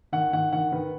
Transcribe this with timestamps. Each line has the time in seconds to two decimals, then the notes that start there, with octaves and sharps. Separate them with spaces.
0.12 D#3 F#5
0.33 D#3 F#5
0.52 D#3 F#5
0.72 D#3 B4